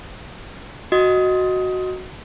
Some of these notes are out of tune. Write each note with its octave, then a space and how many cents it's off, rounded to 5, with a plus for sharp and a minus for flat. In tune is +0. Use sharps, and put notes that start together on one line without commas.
F#4 +0 D#5 +0 D#6 +20